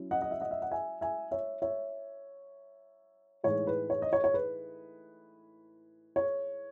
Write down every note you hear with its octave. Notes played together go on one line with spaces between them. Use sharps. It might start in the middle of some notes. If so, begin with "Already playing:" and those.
Already playing: F#3 C#4 E4
D#5 F#5
D#5
E5
D#5 F#5
E5
F#5
E5 G#5
E5 G#5
C#5 E5
C#5 E5
A2 E3 G#3 D#4 C#5
B4
C#5
D#5
C#5
C#5
B4
C#5